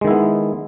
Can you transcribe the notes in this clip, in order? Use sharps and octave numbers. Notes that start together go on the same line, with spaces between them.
D#3 G#3 B3 E4